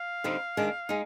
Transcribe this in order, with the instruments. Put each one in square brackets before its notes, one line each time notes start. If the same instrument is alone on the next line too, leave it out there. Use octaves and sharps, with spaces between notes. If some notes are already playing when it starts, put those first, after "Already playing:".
Already playing: [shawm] F5
[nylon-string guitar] D3 G3 C4 D#4
D#3 G#3 D4
G#3 D#4